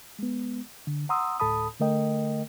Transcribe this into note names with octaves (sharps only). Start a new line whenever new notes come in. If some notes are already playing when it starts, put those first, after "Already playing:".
G#3 B3
D3
F#5 A#5 C6 D#6 E6
D2 A2 A4 A5 B5 D#6
D3 A3 A#4 D#5 G5